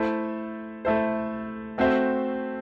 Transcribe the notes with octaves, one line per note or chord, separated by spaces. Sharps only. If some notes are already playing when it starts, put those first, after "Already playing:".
Already playing: A3 E4 A4 C5
A3 E4 A4 C5
A3 C4 F#4 C5 E5